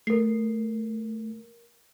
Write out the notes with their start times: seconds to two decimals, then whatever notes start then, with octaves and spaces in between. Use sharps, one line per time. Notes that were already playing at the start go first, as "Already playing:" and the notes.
0.07 A3 A#4 C7